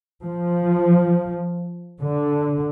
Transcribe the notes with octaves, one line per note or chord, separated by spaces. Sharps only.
F3
D3